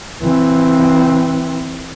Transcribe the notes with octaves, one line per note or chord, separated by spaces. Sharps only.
E3 C4